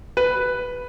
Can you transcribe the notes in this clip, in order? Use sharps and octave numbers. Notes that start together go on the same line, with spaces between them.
B4